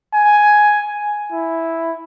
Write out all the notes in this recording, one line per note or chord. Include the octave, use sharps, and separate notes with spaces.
G#5
E4